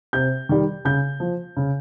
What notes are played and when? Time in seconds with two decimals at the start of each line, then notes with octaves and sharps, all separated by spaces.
0.13 C3 G6
0.49 D#3 G3
0.85 C#3 G6
1.20 F3
1.57 C#3